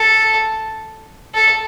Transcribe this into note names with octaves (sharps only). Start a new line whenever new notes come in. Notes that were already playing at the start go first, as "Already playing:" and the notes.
Already playing: A4
A4